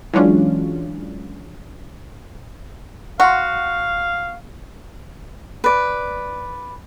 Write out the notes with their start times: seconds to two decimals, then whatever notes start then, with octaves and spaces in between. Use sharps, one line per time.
0.13 E3 F#3 G#3 C#4 D4 F4
3.20 F#4 F5 F#5 C6
5.64 B4 D5